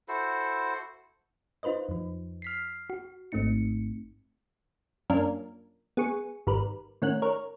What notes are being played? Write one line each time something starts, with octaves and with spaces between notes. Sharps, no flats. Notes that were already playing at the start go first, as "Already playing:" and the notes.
E4 F#4 A4 C5
D#4 F4 B4 C5 D#5
F2 F3
F6 B6 C7
F#4
G#1 G#2 A3 C4 D#4 C#7
F#2 A#3 C#4 D4 F4 A#4
B3 G#4 C#6
G#1 G3 A#4 B4
A2 D#3 C#4 F#5 F#6
A#4 C#5